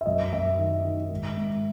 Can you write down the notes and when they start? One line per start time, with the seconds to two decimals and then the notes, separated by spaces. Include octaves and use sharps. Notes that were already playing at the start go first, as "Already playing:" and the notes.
0.01 E5
0.06 F#2 D#5
0.33 F#2 E5
0.59 D#3
0.84 D#3
1.10 G#2
1.37 G#2